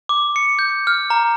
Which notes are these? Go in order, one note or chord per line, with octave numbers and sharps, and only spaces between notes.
D6
C#7
G6
F6
A#5